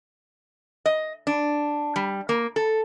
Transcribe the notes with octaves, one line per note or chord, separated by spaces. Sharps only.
D#5
D4
G3
A#3
A4